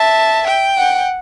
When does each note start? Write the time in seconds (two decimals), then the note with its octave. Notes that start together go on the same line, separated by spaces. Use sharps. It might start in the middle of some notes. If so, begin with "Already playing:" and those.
Already playing: E5 A5
0.47 G5
0.78 F#5